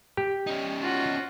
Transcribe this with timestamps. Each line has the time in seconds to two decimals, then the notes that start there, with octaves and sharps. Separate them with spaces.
0.17 G4
0.47 C#4 D#4
0.81 F4 F#4